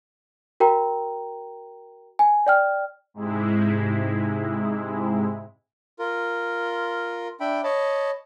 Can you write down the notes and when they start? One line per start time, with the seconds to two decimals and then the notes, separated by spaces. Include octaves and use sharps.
0.60 F#4 A#4 G5 A#5
2.19 G#5
2.47 D5 G5 F6
3.14 G#2 C3 G#3 E4
5.99 F4 A#4
7.40 D4 E5 G5 B5
7.64 C#5 D#5 A5 B5